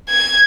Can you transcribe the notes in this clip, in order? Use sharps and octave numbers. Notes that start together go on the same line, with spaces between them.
G#6